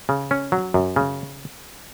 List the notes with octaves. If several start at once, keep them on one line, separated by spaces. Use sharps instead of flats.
C#3
C#4
F#3
F#2
C#3